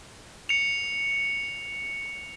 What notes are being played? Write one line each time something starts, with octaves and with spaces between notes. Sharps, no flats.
C#7 F7